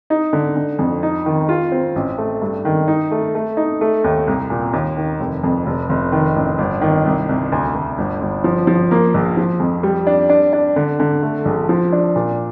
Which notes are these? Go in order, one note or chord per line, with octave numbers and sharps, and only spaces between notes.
D#4
D3
D3
F2
D#4
D#3
F4
C4
A1
A3
G2
D#3
D#4
A3
A3
D#4
A3
D#2
C2
A#2
D#2
D#3
F1
F2
F1
F1
D#3
A1
G1
D#3
C2
C2
D2
D2
G1
G1
F3
F3
A#3
A#1
F3
F2
G3
D4
D4
D4
D3
D3
A3
A#1
F3
D4
A#2